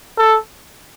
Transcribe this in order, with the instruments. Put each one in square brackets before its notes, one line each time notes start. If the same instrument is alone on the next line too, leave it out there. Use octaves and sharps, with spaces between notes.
[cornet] A4